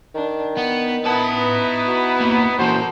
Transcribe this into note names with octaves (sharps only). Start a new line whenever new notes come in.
D#3 D4
B3 F#5
B3 D#4 E4 B4 A5
F#4
E2 A#3
A#2 E3 F#4 A4 A#4 C5